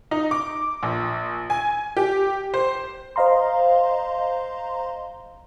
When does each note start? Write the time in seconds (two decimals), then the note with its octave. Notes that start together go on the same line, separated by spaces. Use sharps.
0.11 D#4
0.31 D6
0.83 A#1
1.50 G#5
1.97 G4
2.54 C5
3.16 C5 D#5 F5 A#5 C6